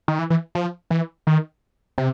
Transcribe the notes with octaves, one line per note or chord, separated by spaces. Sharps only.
D#3
E3
E3
F3
E3
D#3
C3